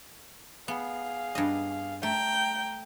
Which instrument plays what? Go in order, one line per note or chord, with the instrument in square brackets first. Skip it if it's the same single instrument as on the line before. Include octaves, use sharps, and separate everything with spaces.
[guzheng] B3 [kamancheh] G#4 F5
[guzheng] G2 D#5
[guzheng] A3 [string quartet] G5 [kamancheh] A#5